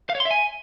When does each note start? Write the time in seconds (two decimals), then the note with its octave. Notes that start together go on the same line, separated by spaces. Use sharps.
0.10 F5
0.15 C#5
0.20 C6
0.25 E5
0.31 G#5